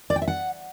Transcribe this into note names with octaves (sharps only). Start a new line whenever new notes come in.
D5
G5
E5
F#5